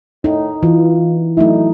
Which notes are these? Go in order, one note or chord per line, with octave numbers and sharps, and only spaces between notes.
A2 D#4
E3 F4
F#3 A3 D#4 E4